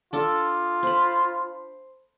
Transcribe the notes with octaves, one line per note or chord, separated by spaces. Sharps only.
D4 F4 A4
C5 B5